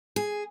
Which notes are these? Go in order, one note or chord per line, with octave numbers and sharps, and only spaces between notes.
G#4